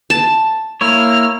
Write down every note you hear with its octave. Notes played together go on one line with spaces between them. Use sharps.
A5
A#3 E4 C#5 F6